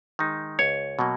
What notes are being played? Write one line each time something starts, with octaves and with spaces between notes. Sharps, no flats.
D#3 G#3 D#4
C#2 C#5
B2 F#3 A#3